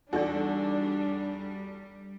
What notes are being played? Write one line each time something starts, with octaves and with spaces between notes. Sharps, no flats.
E2 G3 D4 D#4 F#4 A4 D5